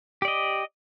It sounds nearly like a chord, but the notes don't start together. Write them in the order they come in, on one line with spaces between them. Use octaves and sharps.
G4 D5 D#5